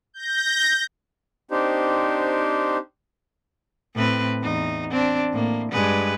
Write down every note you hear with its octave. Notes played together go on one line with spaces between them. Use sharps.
G6 A#6
C4 D4 D#4 G4 C5
A2 C4 B4
E2 D#4
C4 D4
A2 A#3
G2 G#3 B4